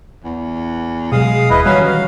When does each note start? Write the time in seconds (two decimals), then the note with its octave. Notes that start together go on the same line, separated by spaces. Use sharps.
0.24 E2
1.12 B2 F#3 G#3 F5 D#6
1.50 D#1 E4 B4 D#5
1.65 D#3 E3 F#3 G3 C#4 B4 F5
1.86 F5